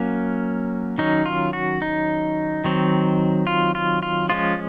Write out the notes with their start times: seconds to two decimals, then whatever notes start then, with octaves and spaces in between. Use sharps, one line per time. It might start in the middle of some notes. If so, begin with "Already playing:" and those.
Already playing: F#3 A#3 C#4
0.98 D#3 F#3 C#4 D#4
1.26 F4
1.53 F#4
1.82 D#4
2.64 D#3 F#3 C4
3.47 F4
3.75 F4
4.03 F4
4.29 F3 G#3 C#4 F4